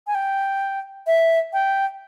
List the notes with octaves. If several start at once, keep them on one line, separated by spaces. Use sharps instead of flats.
G#5
G5
E5
G5